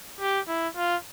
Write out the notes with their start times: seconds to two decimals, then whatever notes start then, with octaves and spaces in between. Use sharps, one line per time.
0.21 G4
0.48 E4
0.77 F4